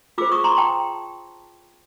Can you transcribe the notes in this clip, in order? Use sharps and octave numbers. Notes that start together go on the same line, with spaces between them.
F4 G#4 C5 D6 E6
C#6 D#6
A#5 C6
G5 A5